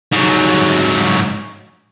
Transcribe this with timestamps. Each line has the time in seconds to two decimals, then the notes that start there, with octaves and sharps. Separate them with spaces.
0.13 G#2 F#3